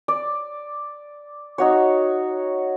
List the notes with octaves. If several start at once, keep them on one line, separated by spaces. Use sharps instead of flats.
D5
D#4 F#4 C#5